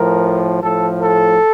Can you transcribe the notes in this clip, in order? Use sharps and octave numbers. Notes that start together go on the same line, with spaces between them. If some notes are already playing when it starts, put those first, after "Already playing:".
Already playing: A2 F3 A#4
A2 F3 A4
A4